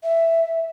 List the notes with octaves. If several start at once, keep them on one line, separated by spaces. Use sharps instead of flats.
E5